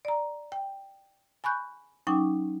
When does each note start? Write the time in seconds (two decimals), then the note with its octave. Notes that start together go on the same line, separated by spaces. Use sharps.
0.05 D5 A#5
0.52 G5
1.44 G#5 B5 C#6 F#6 G6
2.07 F#3 C#4 D#4 G5 C#6 D6